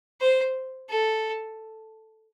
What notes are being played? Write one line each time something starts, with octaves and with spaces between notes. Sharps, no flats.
C5
A4